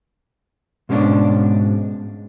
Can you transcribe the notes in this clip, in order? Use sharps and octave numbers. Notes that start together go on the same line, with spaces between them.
G#2 B2 G#3 C#4 D4